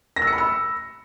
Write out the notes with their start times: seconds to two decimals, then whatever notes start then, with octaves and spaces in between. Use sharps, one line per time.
0.16 A#6
0.22 E6
0.27 C#7
0.33 B5
0.38 E6